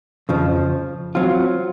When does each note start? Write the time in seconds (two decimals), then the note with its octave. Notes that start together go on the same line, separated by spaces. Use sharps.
0.29 F2 C#3 F3
1.15 F#3 C4 F4